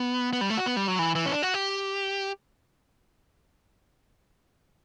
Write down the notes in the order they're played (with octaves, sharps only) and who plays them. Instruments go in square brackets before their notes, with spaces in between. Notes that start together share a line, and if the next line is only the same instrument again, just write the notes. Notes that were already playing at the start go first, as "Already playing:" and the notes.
Already playing: [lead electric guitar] B3
B3
G3
A3
F#4
B3
G3
F#3
E3
E3
C#4
D4
F#4
G4